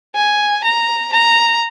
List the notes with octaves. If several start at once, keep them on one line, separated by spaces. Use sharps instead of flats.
G#5
A#5
A#5